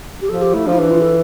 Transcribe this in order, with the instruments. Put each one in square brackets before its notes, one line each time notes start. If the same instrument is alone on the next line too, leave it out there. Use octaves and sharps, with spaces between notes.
[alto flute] G4
[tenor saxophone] F3 [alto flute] A4
[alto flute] G4
[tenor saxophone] A3 [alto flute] E4
[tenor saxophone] F3 [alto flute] D4
[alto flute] E4
[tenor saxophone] E3 [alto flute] D4
[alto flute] F4
A4